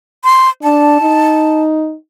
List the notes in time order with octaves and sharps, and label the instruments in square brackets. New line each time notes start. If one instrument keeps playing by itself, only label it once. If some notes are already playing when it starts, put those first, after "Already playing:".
[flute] C6
[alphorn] D4 [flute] A5
[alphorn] D#4